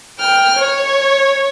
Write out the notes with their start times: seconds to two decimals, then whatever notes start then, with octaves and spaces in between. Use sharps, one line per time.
0.19 G5 F6
0.59 C#5